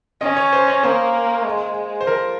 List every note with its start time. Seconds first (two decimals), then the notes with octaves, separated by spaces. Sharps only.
0.21 C#4 D#5
0.37 C#5
0.53 C5
0.68 C#5
0.83 A#3 C5
1.46 G#3
2.01 C5
2.07 F3 A#4